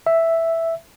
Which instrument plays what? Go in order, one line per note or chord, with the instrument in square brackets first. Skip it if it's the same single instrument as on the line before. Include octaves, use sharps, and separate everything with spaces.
[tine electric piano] E5